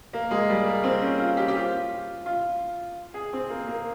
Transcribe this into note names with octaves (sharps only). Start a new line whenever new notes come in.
A#3
G#3
G3
A#3
C4
C#4
F4
G4
G4
F4
F4
G#4
C4
A#3
A#3